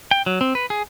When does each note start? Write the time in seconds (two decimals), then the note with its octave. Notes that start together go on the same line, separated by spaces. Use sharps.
0.11 G5
0.26 F#3
0.41 C4
0.55 B4
0.70 G#4